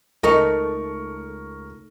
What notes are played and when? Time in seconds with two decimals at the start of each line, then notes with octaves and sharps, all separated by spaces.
0.23 C#2 A3 D#4 A#4 D#5 C#6